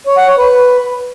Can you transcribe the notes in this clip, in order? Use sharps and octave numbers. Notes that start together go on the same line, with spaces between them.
C#5
F#5
C#5
B4